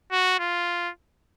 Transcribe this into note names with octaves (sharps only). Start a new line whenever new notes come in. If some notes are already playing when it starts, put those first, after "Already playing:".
F#4
F4